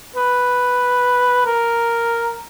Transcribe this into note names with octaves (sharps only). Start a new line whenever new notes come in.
B4
A#4